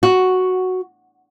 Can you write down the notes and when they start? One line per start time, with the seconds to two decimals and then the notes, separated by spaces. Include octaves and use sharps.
0.03 F#4